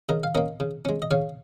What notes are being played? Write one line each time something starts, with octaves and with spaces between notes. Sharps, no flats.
C#3 A#4 D#5
F5
A#3 C#4 A#4 D#5
C#3
G#3 C#4
D#5
C#3 C#5 F5